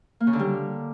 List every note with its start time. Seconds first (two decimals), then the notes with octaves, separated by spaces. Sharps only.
0.20 A#3
0.27 C#3
0.33 D3
0.39 G3